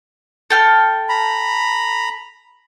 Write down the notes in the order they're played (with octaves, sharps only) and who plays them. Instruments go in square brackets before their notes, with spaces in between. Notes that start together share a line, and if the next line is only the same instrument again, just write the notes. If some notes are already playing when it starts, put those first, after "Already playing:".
[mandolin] A4 G5 F6
[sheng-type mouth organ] A#5 B5